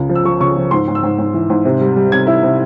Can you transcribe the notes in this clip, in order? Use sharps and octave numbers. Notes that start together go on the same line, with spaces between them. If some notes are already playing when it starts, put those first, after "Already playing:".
Already playing: C#2 C#3
F3
E6
F3 C#6
C#3 C#6
F3
G#2 C6
G#2
E6
G#2
G#2
E3
G#2
C3
G3
G3
C3 G#6
E4
C3